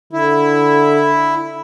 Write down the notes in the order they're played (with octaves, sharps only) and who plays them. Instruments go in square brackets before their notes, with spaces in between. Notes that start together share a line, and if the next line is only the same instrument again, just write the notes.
[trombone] D3 [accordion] E4